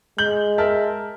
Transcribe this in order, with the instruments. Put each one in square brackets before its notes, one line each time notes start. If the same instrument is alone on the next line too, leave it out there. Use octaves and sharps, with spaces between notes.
[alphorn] G#3 [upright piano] G6 F#7 G7
[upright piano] A#4 E5 A5